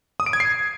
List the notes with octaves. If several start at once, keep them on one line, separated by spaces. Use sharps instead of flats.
D#6
D7
G#6
C7